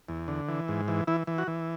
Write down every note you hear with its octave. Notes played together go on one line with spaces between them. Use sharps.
E2
D3
E3
G#2
E3
E3 E4
E3
F#4
E3